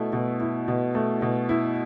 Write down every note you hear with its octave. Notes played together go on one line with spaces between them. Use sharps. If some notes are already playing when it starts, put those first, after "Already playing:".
Already playing: B2 A3 E4
B2
E4
B2
A3
B2
E4